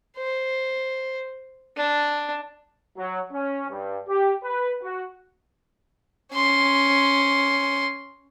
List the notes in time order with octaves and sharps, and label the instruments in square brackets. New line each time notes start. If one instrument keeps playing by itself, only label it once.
[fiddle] C5
D4
[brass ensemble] F#3
C#4
G2
G4
B4
F#4
[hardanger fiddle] C#4 C6